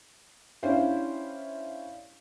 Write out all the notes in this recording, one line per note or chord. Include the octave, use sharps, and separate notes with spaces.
C#4 D4 E4 G4 C5 F5